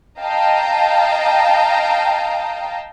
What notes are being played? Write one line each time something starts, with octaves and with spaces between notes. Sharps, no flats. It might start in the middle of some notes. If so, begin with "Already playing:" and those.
D#5 F5 G5 A5 A#5